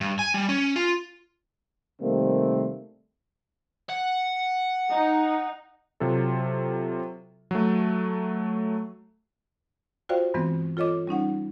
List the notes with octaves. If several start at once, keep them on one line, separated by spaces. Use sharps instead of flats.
G2
G#5
G3
C#4
F4
C3 D#3 G3 A3 A#3 C4
F#5
D#4
C3 F#3 F4 A4
F#3 A3
F4 F#4 C5 D5 F5 G5
G2 E3 G#3 B3 C4
F4 A4 C#5 D#5 D6
G3 C#4 D#4 F#5